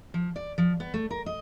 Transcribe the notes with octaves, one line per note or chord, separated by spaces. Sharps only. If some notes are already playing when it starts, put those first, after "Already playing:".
F3
D5
F3
B3
A3
A#4
D#5